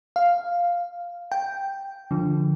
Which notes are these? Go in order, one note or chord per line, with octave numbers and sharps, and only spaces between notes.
F5
G5
D3 F3